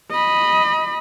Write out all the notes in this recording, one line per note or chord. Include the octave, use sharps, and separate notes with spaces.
D#5 B5